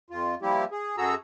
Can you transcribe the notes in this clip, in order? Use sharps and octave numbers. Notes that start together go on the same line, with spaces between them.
F2 F4
F3 G3 A#3 E4 G4
G#4
F#2 F#4 G#4 A4 A#5 E6